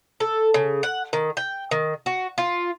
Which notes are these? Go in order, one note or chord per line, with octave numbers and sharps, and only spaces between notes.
A4
C#3
F#5
D#3
G5
D#3
F#4
F4